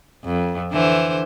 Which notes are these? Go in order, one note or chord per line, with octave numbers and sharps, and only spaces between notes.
F2
D3 E3 C5